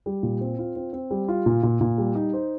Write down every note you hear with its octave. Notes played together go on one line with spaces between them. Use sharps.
G3
A#2
C4
F4
C4
C4
G3
F4
A#2
A#2
A#2
G3
D#4
C5